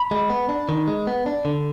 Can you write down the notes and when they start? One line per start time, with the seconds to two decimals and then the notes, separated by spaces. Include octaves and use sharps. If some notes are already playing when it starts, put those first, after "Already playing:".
Already playing: B5
0.11 G#3
0.30 B3
0.49 D4
0.69 D#3
0.87 G#3
1.07 B3
1.26 D4
1.45 D3